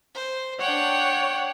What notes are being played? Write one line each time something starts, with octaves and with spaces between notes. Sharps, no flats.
C5
D4 C#5 F#5 G5